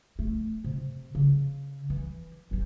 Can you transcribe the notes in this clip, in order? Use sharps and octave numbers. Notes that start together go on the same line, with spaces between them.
A3
C3
C#3
E3
E3 G3